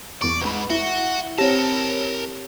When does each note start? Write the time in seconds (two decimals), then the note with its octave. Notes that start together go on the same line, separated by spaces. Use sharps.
0.21 E2 D5 C#6
0.41 B1 G#2 B4 F#5 B5
0.70 E4 F#4 E5 G7
1.38 C4 G4 A#4 C#5 A5 A#6